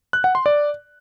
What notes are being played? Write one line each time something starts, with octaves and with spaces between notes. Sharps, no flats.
F#6
F#5
C6
D5